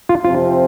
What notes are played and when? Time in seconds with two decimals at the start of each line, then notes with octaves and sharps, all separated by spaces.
0.09 F4
0.25 F2 C3 F3 C4 F4